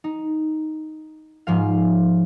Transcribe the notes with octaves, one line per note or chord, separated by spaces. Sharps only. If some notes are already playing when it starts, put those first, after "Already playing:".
D#4
G#2 F3 F5